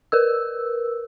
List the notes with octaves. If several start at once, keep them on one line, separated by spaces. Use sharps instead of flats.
A#4 B4 E6